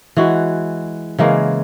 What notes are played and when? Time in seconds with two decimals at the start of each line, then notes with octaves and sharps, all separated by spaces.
0.17 E3 G#3 F#4
1.18 C#3 E3 G#3 A#3